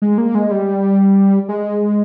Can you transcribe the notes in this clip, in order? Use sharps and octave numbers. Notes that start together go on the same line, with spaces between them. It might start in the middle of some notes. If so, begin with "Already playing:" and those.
G#3
A#3
G#3
G3
G#3